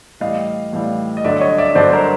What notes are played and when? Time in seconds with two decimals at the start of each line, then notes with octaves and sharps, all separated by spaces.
0.20 A2 E3 G3 D#5 F5
0.73 A2 E3 G3
1.17 D#5
1.24 G2 D3 F#3 D5 E5
1.41 C#5 D#5
1.58 D5 E5
1.75 G2 D3 F#3 C5 D5
1.92 A#4 C5